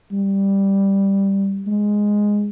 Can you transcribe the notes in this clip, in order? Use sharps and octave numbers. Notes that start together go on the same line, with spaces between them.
G3
G#3